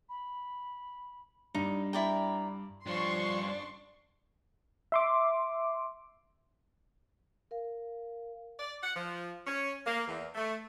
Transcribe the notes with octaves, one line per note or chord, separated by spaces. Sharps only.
B5
G2 D4 D#4
E4 D5 G5 A#5
G2 F3 C#4 D4 C6 C#6
E5 C6 D6
A#4 F5
D5
F#5
F3
C#4
A#3
E2
A3